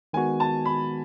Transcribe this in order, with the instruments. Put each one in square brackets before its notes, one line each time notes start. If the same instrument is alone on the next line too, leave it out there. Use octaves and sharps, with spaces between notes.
[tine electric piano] D#3 G#3 B3 F#4 [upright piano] G#5
[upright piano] A5
B5